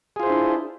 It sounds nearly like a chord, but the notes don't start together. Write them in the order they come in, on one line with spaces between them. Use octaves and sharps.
G#4 F4 C5 E4 D4